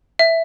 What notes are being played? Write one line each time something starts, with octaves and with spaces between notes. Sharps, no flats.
E5